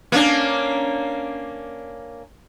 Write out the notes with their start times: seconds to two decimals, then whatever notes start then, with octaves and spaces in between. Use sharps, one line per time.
0.12 A#3 C#4 D4